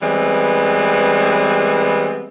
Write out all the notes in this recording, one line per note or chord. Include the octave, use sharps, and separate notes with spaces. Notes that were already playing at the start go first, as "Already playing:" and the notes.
E3 G3 G#3 B3 C4